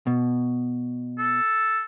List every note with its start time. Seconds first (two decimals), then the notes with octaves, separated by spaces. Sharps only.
0.07 B2
1.18 A4